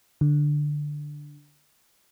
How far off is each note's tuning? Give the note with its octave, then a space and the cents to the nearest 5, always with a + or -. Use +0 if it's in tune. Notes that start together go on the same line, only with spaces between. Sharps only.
D3 +5